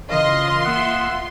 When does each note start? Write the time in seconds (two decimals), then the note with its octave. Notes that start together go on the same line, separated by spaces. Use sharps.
0.10 C#3 E3 F4 A#4 D#5 F5 C6
0.65 A#3 E5 F#5 D#6 C7